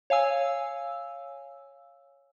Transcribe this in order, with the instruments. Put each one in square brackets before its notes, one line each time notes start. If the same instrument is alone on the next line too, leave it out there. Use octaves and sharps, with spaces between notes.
[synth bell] C#5 F5 G#5 E6